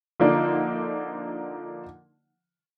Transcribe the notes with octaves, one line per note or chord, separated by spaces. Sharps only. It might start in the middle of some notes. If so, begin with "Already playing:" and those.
D3 F3 A#3 D4 D#4